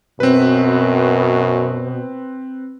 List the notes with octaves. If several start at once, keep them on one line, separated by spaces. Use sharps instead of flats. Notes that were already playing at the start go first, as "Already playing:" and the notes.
F#2 B2 C4 B4